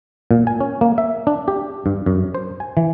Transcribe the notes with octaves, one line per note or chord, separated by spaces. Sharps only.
A#2
G#5
C#4
A#3
E5
D4
G4
G2
F#2
C5
G#5
E3